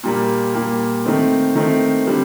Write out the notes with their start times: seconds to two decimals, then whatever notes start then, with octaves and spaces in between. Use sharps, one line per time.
0.03 A#2 G3 A#3
0.55 A#2 G3 A#3
1.06 D#3 A3 C4
1.55 D#3 A3 C4
2.07 D3 G3 C4